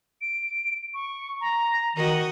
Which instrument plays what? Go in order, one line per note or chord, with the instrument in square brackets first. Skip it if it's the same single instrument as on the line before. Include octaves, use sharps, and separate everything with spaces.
[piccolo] D7
C#6
A#5
[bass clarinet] D#3 [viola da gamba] F#4 D#5